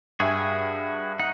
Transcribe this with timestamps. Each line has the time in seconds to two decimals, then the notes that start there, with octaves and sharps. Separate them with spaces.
0.20 G2 F#4 G#4 E5 G5 G#5
1.20 D#4 F#5